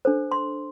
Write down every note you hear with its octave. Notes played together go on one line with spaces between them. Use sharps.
D4 A4 C5
C6